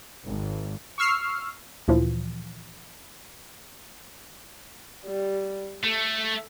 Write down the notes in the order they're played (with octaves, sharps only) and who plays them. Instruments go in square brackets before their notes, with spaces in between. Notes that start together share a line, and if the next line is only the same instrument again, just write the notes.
[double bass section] G#1
[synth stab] C#6 E6 F6 C7
[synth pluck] D2 A#2 E3 F3
[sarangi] G3
[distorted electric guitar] A3 [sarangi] A4